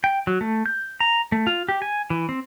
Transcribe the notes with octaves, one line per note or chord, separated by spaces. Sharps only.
G5
F#3
A3
G6
A#5
A3
F4
G4
G#5
E3
C4